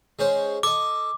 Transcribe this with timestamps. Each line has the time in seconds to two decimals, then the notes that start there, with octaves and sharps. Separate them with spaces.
0.19 G#3 C#4 C5
0.63 A4 D#5 D6